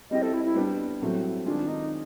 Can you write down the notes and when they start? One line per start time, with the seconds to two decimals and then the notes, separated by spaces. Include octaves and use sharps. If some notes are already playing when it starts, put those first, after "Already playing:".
0.11 G3 C4 E4 G4 D#5
0.22 A4
0.34 E4
0.45 E4
0.56 G3 B3 D4 G4
1.01 A2 F#3 A3 C4
1.45 D#3 G#3 C4 D4 F4 G#4
1.68 D#4